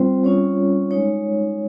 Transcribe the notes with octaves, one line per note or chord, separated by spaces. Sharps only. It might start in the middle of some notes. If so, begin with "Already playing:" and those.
Already playing: G3 C4 F4 C5
G3 C#4 F4 C#5
G#3 D#4 C#5